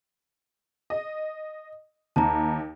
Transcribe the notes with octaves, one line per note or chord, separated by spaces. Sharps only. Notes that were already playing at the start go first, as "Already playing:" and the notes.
D#5
D#2 A5 A#5